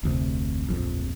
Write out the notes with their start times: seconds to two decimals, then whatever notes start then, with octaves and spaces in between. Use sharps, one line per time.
0.03 F1 D2 C3
0.67 D1 A#1 F2